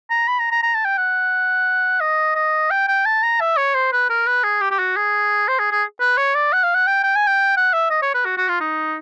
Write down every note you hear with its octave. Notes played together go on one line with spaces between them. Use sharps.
A#5
B5
A#5
A#5
A#5
A5
G5
F#5
D#5
D#5
G5
G5
A5
A#5
E5
C#5
C5
B4
A#4
B4
G#4
G4
G4
F#4
G#4
C5
G#4
G#4
B4
C#5
D5
F#5
F5
F#5
G5
G5
G#5
G5
F#5
E5
D#5
C#5
B4
F#4
F#4
F4
D#4